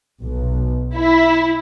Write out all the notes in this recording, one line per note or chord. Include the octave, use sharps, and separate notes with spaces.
B1
E4